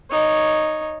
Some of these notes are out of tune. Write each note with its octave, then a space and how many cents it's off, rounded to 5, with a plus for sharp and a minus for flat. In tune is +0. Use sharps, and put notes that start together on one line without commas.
D#4 -5 C#5 +0